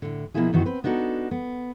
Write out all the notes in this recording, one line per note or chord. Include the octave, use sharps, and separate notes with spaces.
A2 D3
B2 F3 A#3 B3 E4 G#4
F#2 D#3 E3 F#4
C4 B4
B3 D4 D#4 F#4 A4
B3